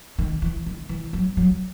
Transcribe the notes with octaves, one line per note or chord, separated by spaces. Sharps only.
D#3
E3
D#3
E3
F#3
F#3